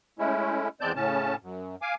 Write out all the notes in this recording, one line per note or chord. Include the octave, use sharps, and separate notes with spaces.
G#3 A3 C#4 E4
E2 G#3 C4 D5 A5 G6
A2 C#3 C#4 A5
F#2
F5 G#5 D6